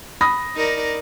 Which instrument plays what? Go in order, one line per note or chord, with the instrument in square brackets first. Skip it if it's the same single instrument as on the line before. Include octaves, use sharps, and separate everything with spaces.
[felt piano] B5 D#6 A#6
[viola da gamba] D#4 A#4 D5